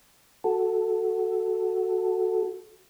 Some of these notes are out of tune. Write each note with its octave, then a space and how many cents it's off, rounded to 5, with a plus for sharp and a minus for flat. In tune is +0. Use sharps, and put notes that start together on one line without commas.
F#4 +0 A4 +0